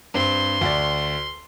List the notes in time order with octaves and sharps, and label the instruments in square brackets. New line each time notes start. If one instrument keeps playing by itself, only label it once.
[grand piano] G2 C4 [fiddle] C6
[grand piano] D2 D5